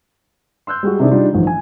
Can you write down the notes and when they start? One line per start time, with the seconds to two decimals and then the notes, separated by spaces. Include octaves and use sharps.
0.67 C6 E6 F#6 G6
0.83 G3 G#3 F#4
0.99 C3 D#3 D4 E4 G#4
1.11 G3 D4 D#4 F4
1.33 A1 D#3 F3 G3
1.47 G#5